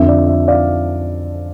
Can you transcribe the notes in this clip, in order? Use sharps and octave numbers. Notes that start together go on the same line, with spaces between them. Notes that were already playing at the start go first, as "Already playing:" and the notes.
Already playing: F2 D3 F3 E5
D5
E5
D5 F5